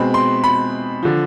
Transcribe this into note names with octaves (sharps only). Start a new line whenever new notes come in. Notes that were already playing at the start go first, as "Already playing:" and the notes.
Already playing: B2 G#3 C4 B5
C6
B5
D3 F3